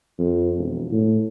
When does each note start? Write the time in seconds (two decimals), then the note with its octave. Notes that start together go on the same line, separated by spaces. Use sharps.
0.19 F2
0.58 E1
0.91 A2